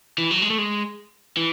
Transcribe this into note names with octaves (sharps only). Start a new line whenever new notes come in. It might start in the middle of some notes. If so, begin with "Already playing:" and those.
E3
F#3
G#3
A3
G#3
E3